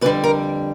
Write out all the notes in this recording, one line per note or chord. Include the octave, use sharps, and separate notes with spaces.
F2 D3 G3 B4
A#4